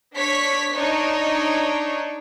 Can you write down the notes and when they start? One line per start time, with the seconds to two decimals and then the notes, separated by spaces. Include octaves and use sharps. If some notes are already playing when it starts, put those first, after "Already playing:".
0.15 D4 C#5 B6
0.74 D4 D#4 C#5